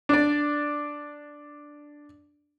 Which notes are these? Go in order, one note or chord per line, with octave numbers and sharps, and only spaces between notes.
D4 D5